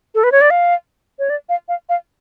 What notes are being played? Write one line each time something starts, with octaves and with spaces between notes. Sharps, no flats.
A4
B4
C#5
D5
F5
C#5
D5
F5
F5
F5